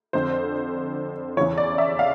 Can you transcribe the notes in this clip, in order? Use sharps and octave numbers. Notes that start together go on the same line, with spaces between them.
F2 D3 C5
E2 C#3 E3 C#5
D5
E5
F5